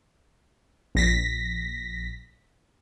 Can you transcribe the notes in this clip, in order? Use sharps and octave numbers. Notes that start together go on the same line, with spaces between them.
A#1 A#6 B6